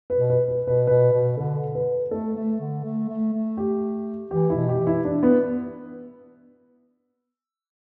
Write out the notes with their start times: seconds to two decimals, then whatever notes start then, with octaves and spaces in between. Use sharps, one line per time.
0.10 B4
0.16 B2
0.30 B4
0.48 B4
0.64 B2 B4
0.87 B2 B4
1.13 B2
1.37 D3 A4
1.75 B4
2.11 A3 A4
2.36 A3
2.60 D3
2.84 A3
3.09 A3
3.33 A3
3.57 G4
4.31 E3 G4
4.50 E4
4.56 B2
4.69 G4
4.80 E3
4.87 E4
5.05 D4
5.23 B3